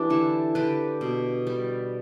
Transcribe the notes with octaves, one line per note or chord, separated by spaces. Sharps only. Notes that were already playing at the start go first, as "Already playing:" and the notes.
Already playing: E3 D4 G4 B4
D3 E4 A4
D3 G4 B4
B2
G3